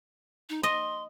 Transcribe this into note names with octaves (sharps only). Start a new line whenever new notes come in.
D#4
D#5 C6